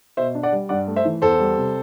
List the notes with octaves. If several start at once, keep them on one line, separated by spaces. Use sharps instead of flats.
B2 C5 E5
D4
D5 F#5
G3
G2 D5 F#5
A3
C5 E5
E3
E2 A4 C5
G3
C3